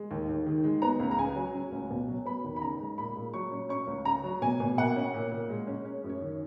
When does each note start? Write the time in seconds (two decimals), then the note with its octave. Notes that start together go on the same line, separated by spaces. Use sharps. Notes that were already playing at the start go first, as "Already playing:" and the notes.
Already playing: G#3
0.11 D#2
0.29 D#2
0.46 D#3
0.64 G#3
0.82 B3 A#5
1.00 C#2
1.11 A#5
1.18 C#3 G#5
1.36 F#3
1.54 C#4
1.72 C#2
1.91 B2
2.08 F#3
2.25 B3 B5
2.44 D#2
2.56 B5
2.62 C#3 A#5
2.79 G#3
2.98 A#2 B5
3.16 A#2
3.34 F#3 C#6
3.51 C#4
3.69 C#4 C#6
3.87 C#2
4.05 C#3 A#5
4.24 F#3
4.42 B2 G#5
4.60 B2
4.78 A#3 F#5
4.96 C#4
5.14 A#2
5.32 A#2
5.49 G#3
5.67 C#4
5.85 C#4
6.04 F#2
6.09 C#5
6.21 D#3